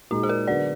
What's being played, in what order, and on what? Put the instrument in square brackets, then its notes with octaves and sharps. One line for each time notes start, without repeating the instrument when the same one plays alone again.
[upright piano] A#2 G#3 D#4 [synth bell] F#4
[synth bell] G#4
A#4
[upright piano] D3 F#3 B3 [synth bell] D5